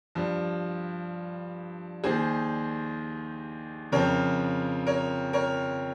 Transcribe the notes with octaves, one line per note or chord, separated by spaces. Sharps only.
G2 F3
D#2 D#3 G#4 C5
F2 C#3 F3 A#4 C#5
A#4 C#5
A#4 C#5